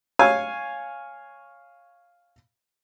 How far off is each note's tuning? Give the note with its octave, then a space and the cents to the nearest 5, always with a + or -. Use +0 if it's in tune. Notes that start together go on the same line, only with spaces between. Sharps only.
C#5 +0 F5 +0 G#5 +0